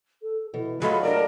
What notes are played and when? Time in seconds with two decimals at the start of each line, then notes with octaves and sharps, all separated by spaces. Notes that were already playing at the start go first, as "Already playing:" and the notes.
0.22 A4
0.54 B2 E3
0.82 F#3 A3 F4 G#4 D#5 B5
1.03 D4 A4 A#4 D5